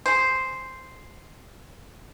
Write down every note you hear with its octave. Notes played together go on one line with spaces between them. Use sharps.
G#4 C5